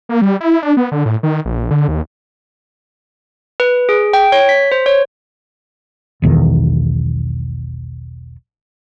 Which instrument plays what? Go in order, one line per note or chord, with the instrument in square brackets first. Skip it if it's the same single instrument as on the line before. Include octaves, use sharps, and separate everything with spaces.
[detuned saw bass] A#3
G3
E4
D4
B3
D3
A2
D#3
A#1
D3
D#2
[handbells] B4
G#4
G5
C#5
B6
C5
C#5
[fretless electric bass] E1 B1 E2 D#3